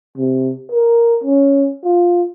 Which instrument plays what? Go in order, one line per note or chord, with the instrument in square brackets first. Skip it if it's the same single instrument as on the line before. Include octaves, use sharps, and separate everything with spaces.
[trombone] C3
A#4
C#4
F4